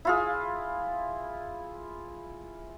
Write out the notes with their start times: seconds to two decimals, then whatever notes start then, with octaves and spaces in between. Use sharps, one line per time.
0.05 E4 F4 G#4